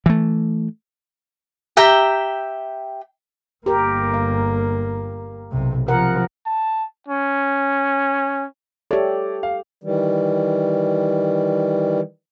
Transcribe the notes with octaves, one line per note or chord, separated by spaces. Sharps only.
E3 A3
G4 E5 G5 A#5
G1 A#3 G4 A#4
F5
B1 C3
C3 F3 A#4 F#5
A5
C#4
G4 A4 C#5 D5 E5
F5
D#3 E3 G3